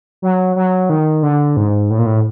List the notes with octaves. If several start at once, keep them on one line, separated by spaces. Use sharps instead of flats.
F#3
F#3
D#3
D3
G#2
A2
A#2
A2